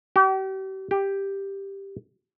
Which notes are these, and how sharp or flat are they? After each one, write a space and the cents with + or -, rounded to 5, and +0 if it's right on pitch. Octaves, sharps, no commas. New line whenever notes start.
G4 -40
G4 +5